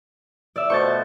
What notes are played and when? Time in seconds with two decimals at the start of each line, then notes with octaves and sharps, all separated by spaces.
0.56 D5 E5
0.70 B2 F3 A3 C#6 G6 A6